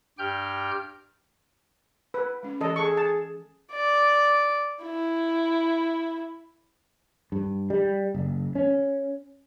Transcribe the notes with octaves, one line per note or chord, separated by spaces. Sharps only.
G2 G4 G5 F6 G6
B4
G#3 C#4
E3 G4 A4 D#5
G#4 A4 C#6
A5
D5
E4
G2
G3
F#1
C#4